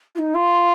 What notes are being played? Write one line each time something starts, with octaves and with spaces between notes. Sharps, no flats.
F4
D#4
F4